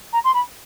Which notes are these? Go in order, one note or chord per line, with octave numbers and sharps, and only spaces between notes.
A#5
C6
B5